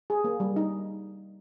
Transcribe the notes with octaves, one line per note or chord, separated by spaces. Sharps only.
G#4
A#3
G3
D#4